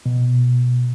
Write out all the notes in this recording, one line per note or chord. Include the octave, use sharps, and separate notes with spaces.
B2